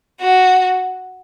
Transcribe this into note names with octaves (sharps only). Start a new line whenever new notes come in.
F#4